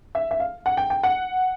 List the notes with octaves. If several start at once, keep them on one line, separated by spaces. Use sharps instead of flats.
E5
E5
F5
F#5
G5
G5
F#5